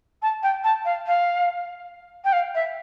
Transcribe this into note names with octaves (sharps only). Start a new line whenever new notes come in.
A5
G5
A5
F5
F5
G5
F5
E5